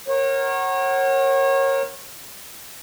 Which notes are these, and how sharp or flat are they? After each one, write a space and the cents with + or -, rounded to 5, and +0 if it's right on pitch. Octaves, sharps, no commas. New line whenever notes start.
A#4 +0 C#5 -30 F#5 +25